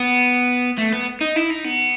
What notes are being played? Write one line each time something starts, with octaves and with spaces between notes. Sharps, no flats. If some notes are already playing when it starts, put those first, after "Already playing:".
Already playing: B3
A3
B3
D#4
E4
D#4
B3